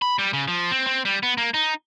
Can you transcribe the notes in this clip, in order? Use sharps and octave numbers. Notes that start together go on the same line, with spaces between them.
B5
G3
C#3
F3
C4
C4
G3
B3
A#3
D#4